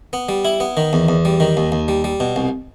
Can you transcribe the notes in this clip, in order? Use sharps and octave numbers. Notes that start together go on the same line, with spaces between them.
B3
G3
E4
B3
D#3
E2
E2
G3
D#3
D#2
D#2
G3
G3
B2
C2